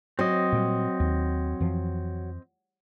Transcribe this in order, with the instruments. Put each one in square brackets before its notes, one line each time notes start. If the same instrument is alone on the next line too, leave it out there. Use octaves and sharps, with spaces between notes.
[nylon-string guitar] F#3 [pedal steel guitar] C4 D#5
[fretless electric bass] A#2 G3
D#2
F2 E3 F3